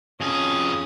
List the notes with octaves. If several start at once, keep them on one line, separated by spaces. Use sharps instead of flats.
F2 C#4 G#4 D#6